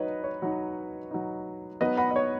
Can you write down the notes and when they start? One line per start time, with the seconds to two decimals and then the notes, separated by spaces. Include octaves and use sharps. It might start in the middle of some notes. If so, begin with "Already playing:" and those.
Already playing: F#3 D#4 B4 C#5 D#5
0.24 C#5
0.42 F#3 D#4
1.11 F#3 D#4
1.81 F#3 B3 D#4 B4 D#5
1.97 F#5 B5
2.11 D#5
2.16 C#5